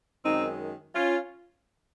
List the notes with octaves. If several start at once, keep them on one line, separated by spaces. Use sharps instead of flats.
F#2 D#3 G#3 C4 D#4
C#4 F4